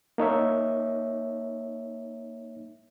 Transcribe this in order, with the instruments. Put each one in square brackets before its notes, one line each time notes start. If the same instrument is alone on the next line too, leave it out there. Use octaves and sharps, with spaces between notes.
[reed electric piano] A#3 D#4 C#5 E5